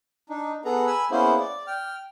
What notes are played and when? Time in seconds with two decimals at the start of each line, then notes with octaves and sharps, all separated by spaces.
0.30 D4 D#4
0.65 B3 G#4 A4 B4 A#5
0.87 G#5 B5 E6
1.11 A#3 B3 C#4 E4 G#4 C5
1.39 D5
1.67 G5 F6